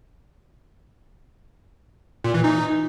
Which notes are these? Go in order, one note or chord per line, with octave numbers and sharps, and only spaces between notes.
A#2
E3
D#4